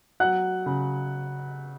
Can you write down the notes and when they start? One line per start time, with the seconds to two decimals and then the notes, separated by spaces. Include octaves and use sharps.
0.20 F#3 F#5 F#6
0.66 C#3